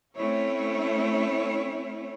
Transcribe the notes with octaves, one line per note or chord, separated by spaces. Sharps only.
A3 C4 C#4 E4 C#5